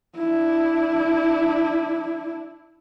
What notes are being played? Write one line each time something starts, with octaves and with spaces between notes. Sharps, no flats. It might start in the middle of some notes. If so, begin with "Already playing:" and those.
D4 E4